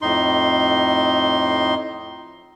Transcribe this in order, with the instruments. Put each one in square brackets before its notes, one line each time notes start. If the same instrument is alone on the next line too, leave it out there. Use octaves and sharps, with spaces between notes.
[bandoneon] F2 A2 D#4 C6